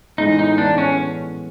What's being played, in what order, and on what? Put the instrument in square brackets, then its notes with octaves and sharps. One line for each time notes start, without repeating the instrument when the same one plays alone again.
[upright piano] A2 E3 G#3 B3 [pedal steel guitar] D#4
[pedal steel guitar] D#4
[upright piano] A2 E3 G#3 B3 [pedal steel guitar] D4
[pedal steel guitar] C#4